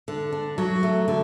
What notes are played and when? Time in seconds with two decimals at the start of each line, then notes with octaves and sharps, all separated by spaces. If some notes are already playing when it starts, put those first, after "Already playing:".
0.08 D3
0.33 D4
0.58 F#3
0.83 A3
1.08 D3